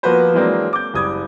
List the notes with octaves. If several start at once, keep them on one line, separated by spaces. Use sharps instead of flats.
F3 A#3 B3 F#4 B4 C5
E3 F#3 G#3 A#3 C4 D4
D6 G6
F#1 G3 D#6 G#6